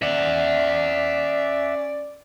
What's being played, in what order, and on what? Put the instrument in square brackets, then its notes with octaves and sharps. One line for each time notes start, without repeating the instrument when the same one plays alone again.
[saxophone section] C#4 D5 [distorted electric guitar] E5 F#5